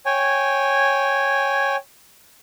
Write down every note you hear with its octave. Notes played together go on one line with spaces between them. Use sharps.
C#5 G5 G#5